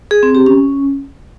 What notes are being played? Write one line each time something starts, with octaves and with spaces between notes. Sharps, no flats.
G#4
C4
G4
C#4